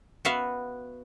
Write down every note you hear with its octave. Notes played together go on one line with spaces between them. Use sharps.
B3 F#4 E5 F5